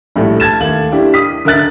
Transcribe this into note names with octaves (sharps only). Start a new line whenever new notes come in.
A#1 A2 G3 A3
A5 G#6 A6 E7
D#2 A3 F#7
D4 E4 G4
D#6 B6
D3 A#4 E5 F#6 A6